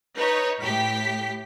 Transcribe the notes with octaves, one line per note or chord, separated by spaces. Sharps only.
D#4 B4 C#5
A2 G4 B6